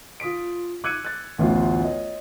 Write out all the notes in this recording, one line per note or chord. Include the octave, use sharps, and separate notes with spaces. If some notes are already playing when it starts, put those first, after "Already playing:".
F4 D#6 B6 D7
D6 E6 F#6 G#6 C#7 D#7
F#6 A6
A1 D2 B3 C#4 F4 F#5
C#5 D#5